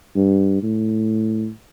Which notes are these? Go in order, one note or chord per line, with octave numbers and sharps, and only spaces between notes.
G2
A2